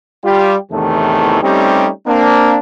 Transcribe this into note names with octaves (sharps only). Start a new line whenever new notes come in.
G3 F4 G4
E2 A2 C3 D#3 E3 A3
G3 A3 C4 C#4 D#4 G4
A#3 C4 D4